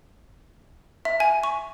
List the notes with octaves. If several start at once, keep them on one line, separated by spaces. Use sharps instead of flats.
E5
G#5
C#6